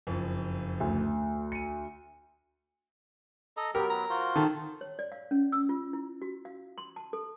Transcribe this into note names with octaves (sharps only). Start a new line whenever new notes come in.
F#1 F2
D2
C#7 D#7
A4 D#5 A#5
F#3 B3 G4 A#4
A#5
F4 F#4 C5
D#3 A4
C#5
D5
F5
C#4
E6
F4
E4
F#4
F5
C6
A5
A4